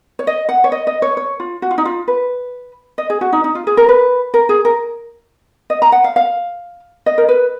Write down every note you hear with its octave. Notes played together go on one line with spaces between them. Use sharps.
C#5
D#5
F#5
C#5
D#5
D#5
C#5
C#5
F4
F#4
F4
D#4
F4
B4
D#5
G#4
F#4
D#4
D#4
F4
G#4
A#4
B4
A#4
G#4
A#4
D#5
A#5
F#5
F5
F5
D#5
A#4
B4